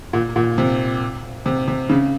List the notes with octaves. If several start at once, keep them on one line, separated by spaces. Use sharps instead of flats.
A#2
A#2
C3
C3
C3
C#3